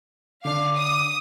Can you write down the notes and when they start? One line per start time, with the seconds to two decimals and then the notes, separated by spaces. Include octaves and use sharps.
0.45 D3 D4 F5 D6
0.77 D#6